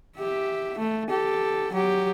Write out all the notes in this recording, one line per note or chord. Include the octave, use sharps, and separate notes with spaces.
G4 E5
A3
G4 A4
F#3 G4